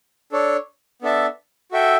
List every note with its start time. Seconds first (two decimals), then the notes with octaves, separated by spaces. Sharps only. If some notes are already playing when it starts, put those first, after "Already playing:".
0.32 D4 A4 C#5
1.02 B3 D4 A4 E5 A5
1.72 F#4 A4 E5 G5